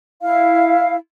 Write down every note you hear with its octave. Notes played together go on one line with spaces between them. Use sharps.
E4 F5